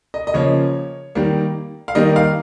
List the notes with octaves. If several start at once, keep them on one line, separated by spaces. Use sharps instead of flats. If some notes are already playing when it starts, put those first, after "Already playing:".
D#5
D#5
C#3 F3 A#3 C#5
D#3 G3 A#3
F5
D#3 G3 A#3 D#5
F5